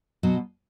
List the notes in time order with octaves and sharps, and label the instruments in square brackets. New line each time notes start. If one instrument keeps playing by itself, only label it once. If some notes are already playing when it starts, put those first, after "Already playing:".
[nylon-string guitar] B2 F#3